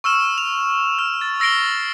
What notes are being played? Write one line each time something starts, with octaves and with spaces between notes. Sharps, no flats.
C#6 E6 F6 E7
F7
F6
A6
E6 A#6 C7 D7 G7